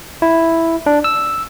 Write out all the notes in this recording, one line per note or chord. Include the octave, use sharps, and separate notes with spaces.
E4
D4
E6